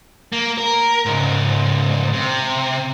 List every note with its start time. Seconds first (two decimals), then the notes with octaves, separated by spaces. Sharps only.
0.32 A#3
0.58 A#4
1.05 C#2 G#2
2.13 C3